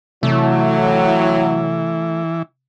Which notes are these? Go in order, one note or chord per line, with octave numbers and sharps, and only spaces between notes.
A2 C3 E3 F#3 A3